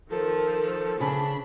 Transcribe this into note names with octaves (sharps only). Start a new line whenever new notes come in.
D#3 F3 A4 A#4
C#3 D4 A5 B5